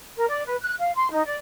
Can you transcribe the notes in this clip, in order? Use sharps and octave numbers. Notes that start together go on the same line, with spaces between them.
A#4
D5
B4
F#6
F5
C6
D#4
D5